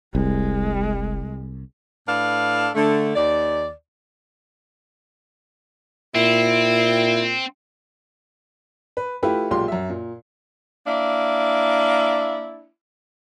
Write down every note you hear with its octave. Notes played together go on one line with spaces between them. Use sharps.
F1 C2 G#3
A2 D4 A4 B4 F5
D3 A3
D#2 D5
A#2 C4 E4
B4
A3 E4 F4 G4 B4
B1 A#2 G#3 F4 G4 C6
F#2 E5
A#2
A#3 D4 E4